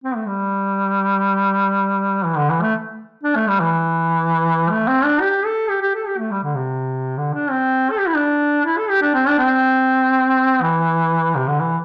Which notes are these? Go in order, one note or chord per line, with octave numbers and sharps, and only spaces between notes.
C4
A3
G3
E3
D3
E3
A3
D4
A3
G3
E3
A3
C4
D4
G4
A4
G4
G4
A4
G4
A3
G3
D3
C3
D3
D4
C4
A4
G4
E4
D4
E4
A4
G4
D4
C4
D4
C4
E3
C3
D3
E3